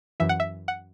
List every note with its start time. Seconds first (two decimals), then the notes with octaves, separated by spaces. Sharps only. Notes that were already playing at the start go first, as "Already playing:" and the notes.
0.20 F#2 E3 E5
0.29 F#5
0.40 E5
0.68 F#5